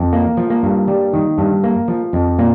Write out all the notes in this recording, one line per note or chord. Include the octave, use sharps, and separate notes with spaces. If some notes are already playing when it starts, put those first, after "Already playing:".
Already playing: F2
A#3
F3
A#3
G2
G3
D#3
G2
A#3
F3
F2
A#2 A#3